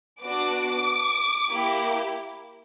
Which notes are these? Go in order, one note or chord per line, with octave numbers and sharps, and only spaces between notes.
B3 D4 F#4 D6
A#3 E4 G4